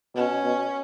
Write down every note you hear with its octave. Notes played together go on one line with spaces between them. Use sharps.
B2 C#4
B2